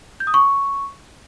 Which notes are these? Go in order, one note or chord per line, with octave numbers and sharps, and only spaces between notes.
G6
D#6
C#6